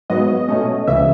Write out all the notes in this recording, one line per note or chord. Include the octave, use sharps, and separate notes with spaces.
G#2 F#3 B3 D#5
B2 A3 C#4
C#2 C#3 E3 E5